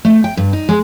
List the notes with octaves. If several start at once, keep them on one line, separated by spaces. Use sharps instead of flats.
A3
G5
G2
D#4
G#3